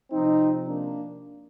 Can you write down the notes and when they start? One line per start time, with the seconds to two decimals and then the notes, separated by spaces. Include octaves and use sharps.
0.12 C3 F3 C4 D#4
0.68 A#3 D4